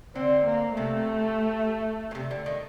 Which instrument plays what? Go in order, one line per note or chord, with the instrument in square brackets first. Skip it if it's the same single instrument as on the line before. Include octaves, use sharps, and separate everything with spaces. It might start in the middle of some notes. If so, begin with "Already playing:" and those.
[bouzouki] D3 [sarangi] C4
[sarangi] A#3
[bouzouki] C3 [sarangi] A3
[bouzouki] A#2
C3
D3
D#3